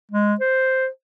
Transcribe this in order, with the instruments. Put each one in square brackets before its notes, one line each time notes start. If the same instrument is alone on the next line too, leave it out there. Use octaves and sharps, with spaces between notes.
[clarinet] G#3
C5